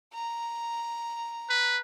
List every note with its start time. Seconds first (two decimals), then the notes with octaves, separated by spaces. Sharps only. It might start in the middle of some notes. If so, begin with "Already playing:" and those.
0.14 A#5
1.50 B4